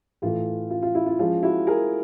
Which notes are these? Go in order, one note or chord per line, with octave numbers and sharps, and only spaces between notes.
A2 E3 A3 F4
F4
F4
E4
F4
F3 G#3 C#4 F4
E4 F#4
G#4 A#4